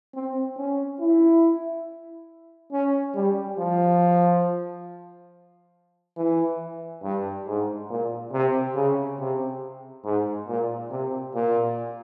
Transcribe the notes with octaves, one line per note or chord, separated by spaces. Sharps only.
C4
C#4
E4
C#4
G3
F3
E3
G2
G#2
A#2
C3
C#3
C3
G#2
A#2
C3
A#2